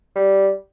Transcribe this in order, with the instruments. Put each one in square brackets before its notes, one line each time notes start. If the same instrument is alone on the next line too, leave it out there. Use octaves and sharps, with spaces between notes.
[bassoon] G3